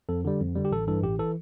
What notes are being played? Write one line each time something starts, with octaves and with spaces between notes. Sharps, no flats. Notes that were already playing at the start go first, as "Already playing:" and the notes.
F2 A4
D3 G3
F2
D3 G3
G4
A1 A4
G2 E3 A4
A1 G4
E3 A4